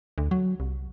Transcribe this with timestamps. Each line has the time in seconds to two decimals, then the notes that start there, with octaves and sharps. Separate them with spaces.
0.18 D2
0.31 F#3
0.60 C2